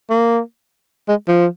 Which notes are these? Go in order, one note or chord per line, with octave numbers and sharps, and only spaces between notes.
A#3
G#3
F3